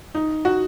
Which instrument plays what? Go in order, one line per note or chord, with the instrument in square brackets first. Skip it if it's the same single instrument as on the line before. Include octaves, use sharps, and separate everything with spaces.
[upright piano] D#4
F#4